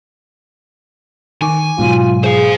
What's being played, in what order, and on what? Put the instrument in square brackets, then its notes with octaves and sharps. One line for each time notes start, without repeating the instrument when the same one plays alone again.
[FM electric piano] D#3 C#6 D6 [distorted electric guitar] G#5
[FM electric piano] G#2 B2 F#3 [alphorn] F4
[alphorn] G#4 [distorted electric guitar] C5 F5